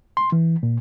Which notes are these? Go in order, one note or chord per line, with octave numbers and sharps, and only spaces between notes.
C6
E3
A#2